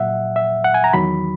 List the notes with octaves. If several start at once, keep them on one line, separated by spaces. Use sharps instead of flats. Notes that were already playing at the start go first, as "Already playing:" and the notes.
Already playing: A#2 F#3 E5 F#5
E5
F#5
G#5
A#5
E2 D#3 F#3 B5